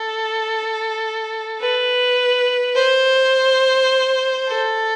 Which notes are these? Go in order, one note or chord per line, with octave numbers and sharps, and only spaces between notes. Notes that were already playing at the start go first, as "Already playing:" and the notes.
Already playing: A4
B4
C5
A4